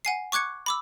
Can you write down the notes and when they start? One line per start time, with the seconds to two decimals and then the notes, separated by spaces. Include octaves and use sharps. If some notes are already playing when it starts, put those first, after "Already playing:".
0.05 F#5 G#5 C7
0.32 C#6 D6 F#6 G#6 C#7
0.66 B5 D6 E6